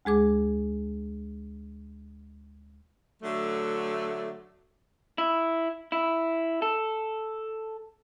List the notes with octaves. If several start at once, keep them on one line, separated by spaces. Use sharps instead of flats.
D2 G#3 G#4 D6
D3 F#3 A3
E4
E4
A4